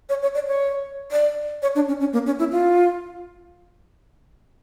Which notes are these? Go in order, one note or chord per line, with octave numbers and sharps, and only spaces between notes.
C#5
C#5
D5
C#5
D5
C#5
D4
C#4
C#4
A#3
C#4
E4
F4